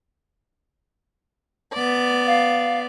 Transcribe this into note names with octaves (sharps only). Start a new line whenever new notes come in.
B3 D5
F5